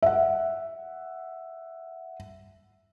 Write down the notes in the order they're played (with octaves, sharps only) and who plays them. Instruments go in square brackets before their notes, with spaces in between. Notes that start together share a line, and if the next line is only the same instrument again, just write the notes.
[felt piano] E5 F#5